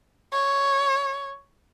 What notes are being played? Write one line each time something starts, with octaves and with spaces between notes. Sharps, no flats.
C#5